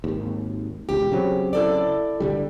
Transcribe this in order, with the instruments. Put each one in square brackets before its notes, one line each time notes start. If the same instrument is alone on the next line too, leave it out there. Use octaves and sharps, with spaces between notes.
[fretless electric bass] G#1 D#2
[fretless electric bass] E1 C#2 [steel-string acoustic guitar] G4
[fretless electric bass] C#3 F#3 C4
[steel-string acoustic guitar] E4 A4 D5
[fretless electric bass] G1 D3 G3